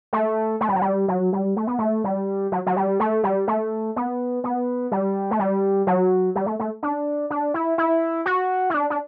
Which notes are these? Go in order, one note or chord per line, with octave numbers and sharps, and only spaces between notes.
A3
A3
G3
F#3
G3
F#3
G3
A3
B3
A3
G3
F#3
F#3
G3
A3
G3
A3
B3
B3
G3
A3
G3
F#3
G3
A3
A3
D4
D4
E4
E4
F#4
E4
D4
D4